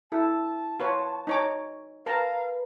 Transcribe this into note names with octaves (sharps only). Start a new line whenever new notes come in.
E4 A4 A5
F4 B4 C#5
D#4 C#5 D6
A#4 B4 F5 A5 A#5